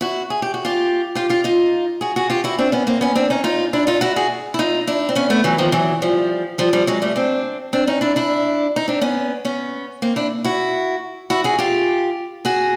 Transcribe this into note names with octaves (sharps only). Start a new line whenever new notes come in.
E4 F#4
G#4
G4
F#4
F4 G4
F4 G4
F4 G4
D#4 F4
F#4 G#4
F#4 G#4
F4 G4
E4 F#4
C4 D4
B3 C#4
A#3 C4
B3 C#4
C4 D4
C#4 D#4
D#4 F4
D4 E4
D#4 F4
E4 F#4
F#4 G#4
E4
D#4 F4
D4 E4
C4
B3 C#4
A3 B3
E3 F#3
D#3 F3
E3 F#3
F3 G3
F3 G3
F3 G3
F#3 G#3
G3 A3
C4 D4
C4 D4
C#4 D#4
D4 E4
D4 E4
D#4
C4 D4
B3 C#4
B3 C#4
A#3 C4
D4 E4
E4 F#4
E4 F#4
F#4 G#4
F4 G4
F#4 G#4